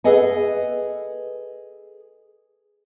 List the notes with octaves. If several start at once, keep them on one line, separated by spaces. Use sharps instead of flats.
G#4 A4 B4 D#5 F#5 G#5